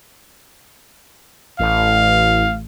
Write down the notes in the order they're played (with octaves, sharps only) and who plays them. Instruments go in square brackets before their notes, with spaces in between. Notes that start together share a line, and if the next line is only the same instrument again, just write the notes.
[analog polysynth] A1 [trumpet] F5